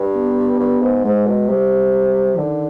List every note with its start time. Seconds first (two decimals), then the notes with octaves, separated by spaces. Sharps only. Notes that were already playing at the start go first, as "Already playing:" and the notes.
Already playing: G2
0.15 B3
0.60 G2
0.82 G#2
1.04 G#2 G#3
1.26 B2
1.48 C3 G3
2.37 D3 D#3